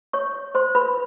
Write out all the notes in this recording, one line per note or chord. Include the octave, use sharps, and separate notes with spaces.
C#5 C#6
C5 C6
B4 B5